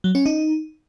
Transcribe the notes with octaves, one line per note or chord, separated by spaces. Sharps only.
F#3
C#4
D#4